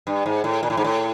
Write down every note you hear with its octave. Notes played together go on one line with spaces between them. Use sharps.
G2
G#2
A2
A#2
A2
G#2
A2